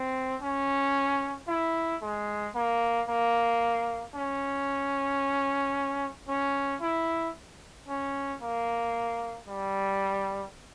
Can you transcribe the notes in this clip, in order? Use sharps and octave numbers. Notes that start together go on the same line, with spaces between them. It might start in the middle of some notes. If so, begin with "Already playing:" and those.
Already playing: C4
C#4
E4
G#3
A#3
A#3
C#4
C#4
E4
C#4
A#3
G3